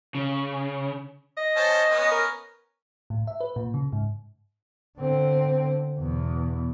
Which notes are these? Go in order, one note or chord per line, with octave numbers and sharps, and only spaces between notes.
C#3
D#5
C#4 C5 A5
B3 C#4
A#4
A2
E5
B4
A#2
C#3
G#2
D3 C4
E2 B2